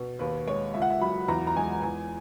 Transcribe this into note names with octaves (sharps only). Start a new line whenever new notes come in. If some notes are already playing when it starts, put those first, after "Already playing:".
Already playing: B2
D#2 B4
G#3 C#5
C#2 E5
F#5
E5
F#3 B5
E2 A#5
A#5
G#3 G#5
E2 G#5